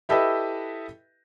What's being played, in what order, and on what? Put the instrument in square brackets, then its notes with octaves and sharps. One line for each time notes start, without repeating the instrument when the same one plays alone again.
[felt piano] E4 G4 A4 B4 D#5 E5